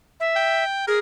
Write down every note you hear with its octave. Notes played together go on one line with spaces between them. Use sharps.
E5
G5
G#4 A#4